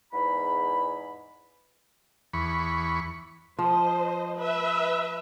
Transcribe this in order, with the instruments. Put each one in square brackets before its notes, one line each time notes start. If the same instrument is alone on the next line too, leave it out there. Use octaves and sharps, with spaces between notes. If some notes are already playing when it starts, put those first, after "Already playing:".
[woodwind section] E2 G#2 B5
[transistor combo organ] E2 B5 C#6
[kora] F3 [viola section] C5 D#5
[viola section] B4 E5